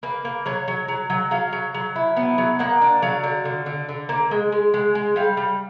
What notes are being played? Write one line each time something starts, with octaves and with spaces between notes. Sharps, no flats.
A#3 B4
A#3
F#3 C#5
F#3
F#3
F#3
F#3 F5
F#3
F#3
E4
B3
F#3
A#3 F#5
D4
F#3 F5
D3
D3
D3
D3
A#3
G#3
G#3
G#3
G#3
G3 F5
G3